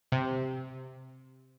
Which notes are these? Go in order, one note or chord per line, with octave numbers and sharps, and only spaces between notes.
C3